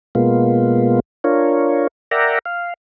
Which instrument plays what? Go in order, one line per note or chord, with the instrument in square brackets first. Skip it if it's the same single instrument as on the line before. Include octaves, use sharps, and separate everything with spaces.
[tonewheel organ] B2 G#3 A#3 B3 F4
D4 F4 A#4 C#5
A#4 D5 E5 F#5 G5 A#5
F5